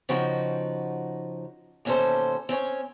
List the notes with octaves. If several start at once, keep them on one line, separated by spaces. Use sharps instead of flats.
C#3 F3 D#4 F#4 G5
D#2 B2 C#4 F4 A4 C5
C4 C#4 C#5